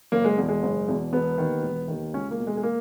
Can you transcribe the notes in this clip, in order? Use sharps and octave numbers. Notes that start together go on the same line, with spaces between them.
F#1 A#3
G#3
E2 B2
G#3
F#1
E2 B2
E1 B3
D#2 D#3
E1
D#2 D#3
C#2 C#4
A#3
B2
G#3
G#3
A#3